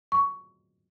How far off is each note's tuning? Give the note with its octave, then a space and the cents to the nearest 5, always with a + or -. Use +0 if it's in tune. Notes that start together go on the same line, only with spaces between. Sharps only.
C#6 +15